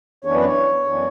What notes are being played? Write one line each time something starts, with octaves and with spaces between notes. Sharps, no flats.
F#2 E3 B3 D4 C#5
B4
C#5
F#2 E3 B3 D4